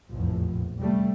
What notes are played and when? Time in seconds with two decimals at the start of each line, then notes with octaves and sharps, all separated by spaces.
0.11 F1 A#1 E2 A2 F3
0.79 C3 G3 A3